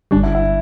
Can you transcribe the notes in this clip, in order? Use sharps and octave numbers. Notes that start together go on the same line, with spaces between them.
G1 G2 D3 G3 D4
E4
E4